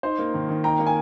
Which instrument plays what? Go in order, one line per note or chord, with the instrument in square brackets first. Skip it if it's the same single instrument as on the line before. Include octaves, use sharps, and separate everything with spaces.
[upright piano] D#4 [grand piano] C5
[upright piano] A#3
D#3
D#3
[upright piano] D#4 [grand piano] G5 A#5
[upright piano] A#3
[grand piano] G#5